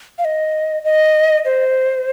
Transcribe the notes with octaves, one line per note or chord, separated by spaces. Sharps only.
F5
D#5
D#5
C5